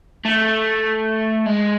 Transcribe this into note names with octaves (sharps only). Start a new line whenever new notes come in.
A3
G#3